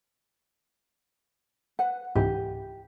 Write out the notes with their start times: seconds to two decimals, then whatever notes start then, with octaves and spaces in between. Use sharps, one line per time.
1.79 B4 F#5
2.15 C#2 G#2 E3 G4